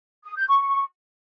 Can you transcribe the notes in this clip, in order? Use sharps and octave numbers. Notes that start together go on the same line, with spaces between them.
D#6
G6
C#6